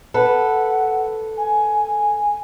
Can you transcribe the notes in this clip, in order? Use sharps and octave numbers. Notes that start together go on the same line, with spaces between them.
A4 B4 F#5
G#5